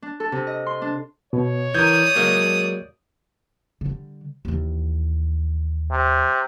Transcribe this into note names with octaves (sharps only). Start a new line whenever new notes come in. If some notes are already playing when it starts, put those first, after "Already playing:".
D4
A4
C3
D#5
C6
D4
B2 C#5
E3 A#4 D5 D#6 G6 G#6
F#3 G#3 A#3
D3 G3
D#2 E3
C3